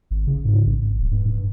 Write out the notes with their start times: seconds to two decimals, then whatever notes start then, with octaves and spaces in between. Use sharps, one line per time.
0.11 G#1
0.27 C#3
0.45 G#2
0.66 A1
0.99 D1
1.11 G2
1.26 G2